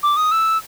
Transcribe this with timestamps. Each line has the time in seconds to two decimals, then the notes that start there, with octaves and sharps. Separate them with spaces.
0.03 D6
0.17 D#6
0.32 E6